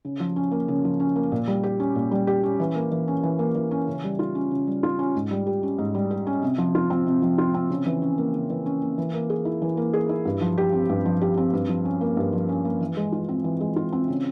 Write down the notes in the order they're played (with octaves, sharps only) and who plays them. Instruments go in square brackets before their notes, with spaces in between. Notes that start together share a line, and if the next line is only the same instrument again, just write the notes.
[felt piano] C#3
F3
C#4
A#3
C#3
F3
C#4
A#3
A#2
G3
G4
C#4
A#2
G3
G4
C#4
E3
A#3
E3
C#4
E3
A#3
E3
C#4
C#3
G3
F4
C#4
C#3
G3
F4
C#4
G#2
G3
G4
C#4
G#2
G3
G4
C#4
C3
F3
F4
C4
C3
F3
F4
C4
C#3
E3
C#4
A#3
C#3
E3
C#4
A#3
E3
A#3
G#4
E4
E3
A#3
G#4
E4
G2
F3
G4
C4
G2
F3
G4
C4
G2
F3
C#4
A#3
G2
F3
C#4
A#3
E3
G#3
F4
C4
E3
G#3
F4
C4
C#3